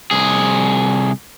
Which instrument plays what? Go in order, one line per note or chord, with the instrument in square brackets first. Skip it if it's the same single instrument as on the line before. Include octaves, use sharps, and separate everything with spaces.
[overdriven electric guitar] C2 G#4